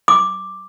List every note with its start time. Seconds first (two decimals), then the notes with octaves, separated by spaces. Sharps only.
0.08 D6